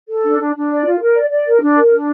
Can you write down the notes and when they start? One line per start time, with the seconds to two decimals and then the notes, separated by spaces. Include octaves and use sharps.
0.08 A4
0.25 D4
0.39 D4
0.55 D4
0.69 D5
0.85 F4
1.00 A#4
1.15 D5
1.30 D5
1.46 A#4
1.61 D4
1.76 A#4
1.91 D4